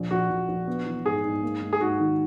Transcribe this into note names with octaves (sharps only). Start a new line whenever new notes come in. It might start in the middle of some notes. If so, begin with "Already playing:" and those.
Already playing: A#1
A#1 F#4
A#1
A#1
B3
E3
G#2 G#4
G#2
A#3
G#2
G#4
G#2 F#4
D#3